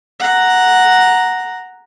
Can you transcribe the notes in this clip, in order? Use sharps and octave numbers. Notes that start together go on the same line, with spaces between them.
F#5 A#5